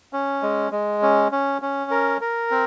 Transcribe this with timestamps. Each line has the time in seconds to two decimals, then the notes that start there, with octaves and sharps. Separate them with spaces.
0.13 C#4
0.42 G#3
0.72 G#3
1.02 C#4
1.32 C#4
1.62 C#4
1.91 A#4
2.21 A#4
2.51 C4